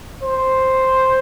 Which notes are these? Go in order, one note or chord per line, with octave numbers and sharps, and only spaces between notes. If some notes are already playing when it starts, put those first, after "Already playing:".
C5